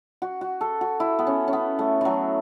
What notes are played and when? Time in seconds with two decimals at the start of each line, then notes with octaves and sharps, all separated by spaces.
0.22 F#4
0.41 F#4
0.61 A4
0.81 F#4
1.00 E4
1.19 B3
1.27 C#4
1.48 C#4
1.53 B3
1.79 A3
2.01 E3 F#3